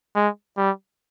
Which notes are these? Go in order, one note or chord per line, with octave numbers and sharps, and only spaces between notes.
G#3
G3